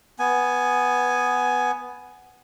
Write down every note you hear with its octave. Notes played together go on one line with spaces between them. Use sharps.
B3 G#5